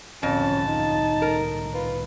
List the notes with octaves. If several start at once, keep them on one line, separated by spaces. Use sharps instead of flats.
C2 F2 A2 D3 C#4 A5
D#4
A#4
F4 B4